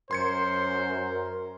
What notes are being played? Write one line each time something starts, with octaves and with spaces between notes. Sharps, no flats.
F#2 A#4 C5 C6 G#6 C#7